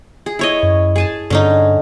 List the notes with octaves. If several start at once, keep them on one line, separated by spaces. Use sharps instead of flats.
G#4
E4 C#5 D#5
F#2
G#4 G#5 A5
G2 D3 C#4 D#4